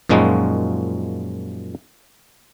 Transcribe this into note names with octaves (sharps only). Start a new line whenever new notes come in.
F#2 A#2 F3 G#3 D#4 F#4